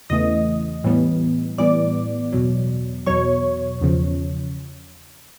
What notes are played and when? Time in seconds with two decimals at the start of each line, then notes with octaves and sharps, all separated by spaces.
0.09 E2 C#3 E3 A3 D#5 D#6
0.84 A2 E3 G3 B3
1.58 A2 E3 G3 B3 D5 D6
2.32 E2 B2 F#3
3.06 E2 B2 F#3 C#5 C#6
3.81 E2 C#3 F3